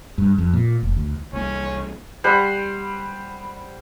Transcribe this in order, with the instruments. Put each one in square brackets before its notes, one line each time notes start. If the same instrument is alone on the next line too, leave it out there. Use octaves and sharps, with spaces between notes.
[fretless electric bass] G2
F2
A#2
F1
D2
[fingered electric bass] C2 A#3 [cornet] C#4
[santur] G3 C5 F#5 B5